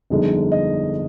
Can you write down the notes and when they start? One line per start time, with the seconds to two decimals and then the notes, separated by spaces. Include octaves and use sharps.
0.10 G1 F2 D3 G#3 D#4
0.52 D#5